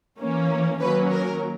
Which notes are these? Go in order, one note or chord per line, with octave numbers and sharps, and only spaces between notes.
E3 A#3 C#4
D#3 F#3 A#3 C#4 B4
A#4